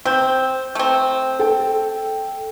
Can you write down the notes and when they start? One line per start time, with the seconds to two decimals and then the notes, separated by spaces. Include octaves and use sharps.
0.05 C4 G6
0.75 A3 C4
1.39 A4 G5